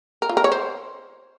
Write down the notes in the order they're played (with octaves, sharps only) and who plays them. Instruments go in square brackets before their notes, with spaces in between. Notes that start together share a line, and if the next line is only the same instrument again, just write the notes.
[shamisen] A#4
F4
A#4
C#5
C5